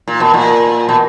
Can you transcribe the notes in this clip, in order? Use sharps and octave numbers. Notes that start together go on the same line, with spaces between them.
A#2
B2
A#2
B2